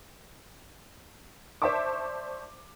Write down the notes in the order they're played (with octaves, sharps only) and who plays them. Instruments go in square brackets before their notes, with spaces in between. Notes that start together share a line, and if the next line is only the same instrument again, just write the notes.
[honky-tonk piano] C5 D5 E5 A5 C#6 D6